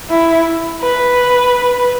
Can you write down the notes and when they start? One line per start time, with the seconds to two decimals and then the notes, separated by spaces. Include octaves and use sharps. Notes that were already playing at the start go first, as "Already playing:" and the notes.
0.10 E4
0.82 B4